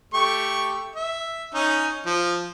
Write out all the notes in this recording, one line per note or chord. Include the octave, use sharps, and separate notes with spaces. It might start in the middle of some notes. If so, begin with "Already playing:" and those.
A3 G4 C#6
E5
C#4 D#4
F3